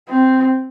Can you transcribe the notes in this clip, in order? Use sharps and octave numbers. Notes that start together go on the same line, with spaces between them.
C4